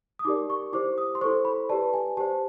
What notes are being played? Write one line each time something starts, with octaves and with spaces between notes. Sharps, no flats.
D#6
D#4 G4 A#4 D5 D6
C#6
E4 G4 C5 D6
D#6
C6
E4 A4 C5 C#6
B5
G4 B4 D5 A5
G#5
G4 C5 A5